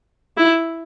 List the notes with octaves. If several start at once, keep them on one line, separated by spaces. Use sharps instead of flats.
E4